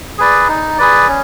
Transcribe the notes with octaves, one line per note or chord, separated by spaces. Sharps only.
G#4 B4 D5
D#4
G#4 B4 D5
C#4